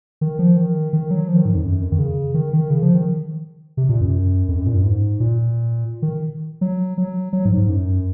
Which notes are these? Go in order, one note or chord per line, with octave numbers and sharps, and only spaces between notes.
D#3
F3
D#3
D#3
F#3
F3
D#3
G#2
F2
F#2
F2
D#3
C#3
D#3
D#3
C#3
F3
D#3
C3
A#2
F#2
F2
F#2
A#2
F#2
G#2
A#2
D#3
F#3
F#3
F#3
G#2
G#2
F#2